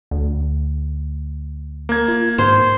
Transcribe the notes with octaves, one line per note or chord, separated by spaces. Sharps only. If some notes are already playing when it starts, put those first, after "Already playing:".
D2
A#3 G#6
F4
G#2 C5